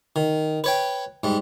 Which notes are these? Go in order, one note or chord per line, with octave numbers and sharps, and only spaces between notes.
D#3
B4 C#5 G5
G#2 G3